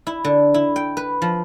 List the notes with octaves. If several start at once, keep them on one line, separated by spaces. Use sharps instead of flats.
E4
D3
E4
G5
B4
F3